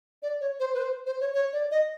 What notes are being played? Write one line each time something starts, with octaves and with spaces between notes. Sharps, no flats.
D5
C#5
C5
B4
C5
C5
C#5
C#5
D5
D#5